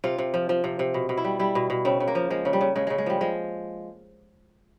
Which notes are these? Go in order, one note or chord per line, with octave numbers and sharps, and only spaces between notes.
C3 F4
C3
F3
F3
C3
C3
B2
B2
E4
G3
G3 E4
B2
B2
C#3 C4
C#3
A#3
F3
F3 G#3
C#3
G3
C#3
C#3 G#3
C#3 G#3
G#3
F3 G3
F3 G#3